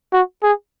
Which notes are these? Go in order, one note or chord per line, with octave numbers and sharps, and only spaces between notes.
F#4
G#4